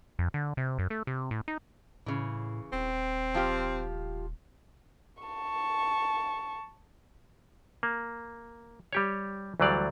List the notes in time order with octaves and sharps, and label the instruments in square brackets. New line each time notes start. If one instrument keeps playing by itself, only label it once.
[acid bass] F2
D3
C3
F#2
A3
C3
A2
D#4
[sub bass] A2 [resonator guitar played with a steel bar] C#3 E3
[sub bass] D#1 [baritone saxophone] C4
[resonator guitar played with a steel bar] F3 F4 G4
[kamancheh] A5 C#6
[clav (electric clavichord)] A#3
G3 G4 C#5
D2 E3 F#3 G3 D5 F5